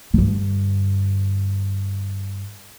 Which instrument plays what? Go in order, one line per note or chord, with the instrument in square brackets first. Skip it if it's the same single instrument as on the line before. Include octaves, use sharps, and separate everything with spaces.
[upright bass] G2 D3